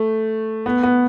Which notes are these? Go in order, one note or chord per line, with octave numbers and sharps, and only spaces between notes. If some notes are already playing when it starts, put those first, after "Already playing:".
Already playing: A3
B3
B3